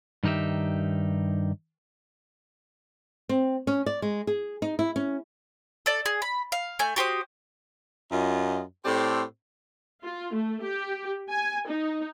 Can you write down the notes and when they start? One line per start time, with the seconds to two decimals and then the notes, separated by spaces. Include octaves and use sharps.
0.23 G2 D#3 D#4 G4 E5
3.29 C4
3.67 C#4
3.86 D5
4.02 G#3
4.27 G#4
4.62 D#4
4.79 E4
4.96 C#4
5.86 A4 D5
6.06 G#4
6.22 B5
6.52 F5
6.79 A3 G#5 G6
6.96 F#4 G4 C5 D#6
8.11 F#2 F4 D#5
8.85 A2 C4 G4 A4 D5 C6
10.03 F4
10.33 A3
10.63 G4
11.30 G#5
11.67 D#4